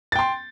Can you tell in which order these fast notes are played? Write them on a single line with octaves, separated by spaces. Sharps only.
A6 G5 C6